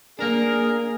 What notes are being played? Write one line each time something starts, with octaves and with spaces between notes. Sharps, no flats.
A#3 D4 G#4 A#4